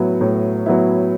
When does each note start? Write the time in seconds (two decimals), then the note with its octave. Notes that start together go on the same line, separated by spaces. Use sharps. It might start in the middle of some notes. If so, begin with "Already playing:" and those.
Already playing: A2 F#3 B3 E4
0.21 A2
0.66 F#3 B3 E4